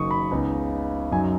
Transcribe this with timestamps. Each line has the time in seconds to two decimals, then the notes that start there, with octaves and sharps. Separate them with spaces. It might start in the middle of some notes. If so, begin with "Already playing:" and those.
Already playing: F#1 F#2 D#3 F#3 D#4 C#6 D#6
0.11 B5
0.31 C#2 C#3 B3 D#4
1.12 F#2 F#3 D#4 G#5